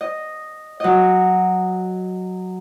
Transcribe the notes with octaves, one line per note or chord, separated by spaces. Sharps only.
D#5
F#3 D#5